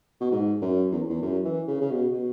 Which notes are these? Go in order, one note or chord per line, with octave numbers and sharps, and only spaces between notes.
B2
G#2
F#2
E2
E2
F#2
E3
C#3
C#3
B2
B2